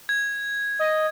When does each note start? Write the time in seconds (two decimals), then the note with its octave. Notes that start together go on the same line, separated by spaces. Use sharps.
0.09 G#6
0.79 D#5